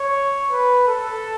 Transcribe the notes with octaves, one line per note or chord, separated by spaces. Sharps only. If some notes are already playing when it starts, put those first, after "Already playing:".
Already playing: C#5
B4
A4